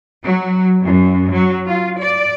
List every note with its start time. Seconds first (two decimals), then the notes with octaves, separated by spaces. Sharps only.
0.24 F#3
0.83 F#2
1.32 F#3
1.66 F4
1.98 D5